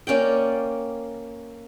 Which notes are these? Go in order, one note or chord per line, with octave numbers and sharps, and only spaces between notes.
A#3 C#4 D5 G5